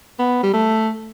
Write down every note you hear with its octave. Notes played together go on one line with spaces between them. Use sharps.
B3
G3
A3